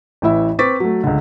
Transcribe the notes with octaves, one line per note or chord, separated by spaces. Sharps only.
A1 E3 E4 E5
C4 B4 C#6 D6 A6 B6
F#3 A3
C#2 D3